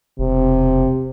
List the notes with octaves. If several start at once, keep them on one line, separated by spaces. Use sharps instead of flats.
E1 C3